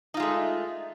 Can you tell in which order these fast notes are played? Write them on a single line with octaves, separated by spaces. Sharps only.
D#4 F4 G#3 A3